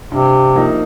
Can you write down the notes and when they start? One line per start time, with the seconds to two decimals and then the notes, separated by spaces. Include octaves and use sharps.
0.12 G2 C3
0.55 F3 A#3 D#4